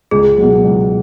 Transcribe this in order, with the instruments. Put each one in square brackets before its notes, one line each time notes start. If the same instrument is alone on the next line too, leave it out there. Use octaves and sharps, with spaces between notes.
[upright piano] C#2 [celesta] G#4
[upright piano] B2 F#3
C#2